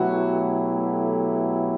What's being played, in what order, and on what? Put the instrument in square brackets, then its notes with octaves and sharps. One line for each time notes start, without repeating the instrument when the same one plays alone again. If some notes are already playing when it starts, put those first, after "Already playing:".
Already playing: [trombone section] B2 F#3 A3 E4 G4 [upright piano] F#4